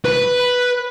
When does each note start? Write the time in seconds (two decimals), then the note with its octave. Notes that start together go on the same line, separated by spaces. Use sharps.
0.05 B4 B5